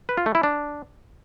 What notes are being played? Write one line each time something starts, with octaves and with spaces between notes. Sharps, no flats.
B4
F4
A3
E4
D4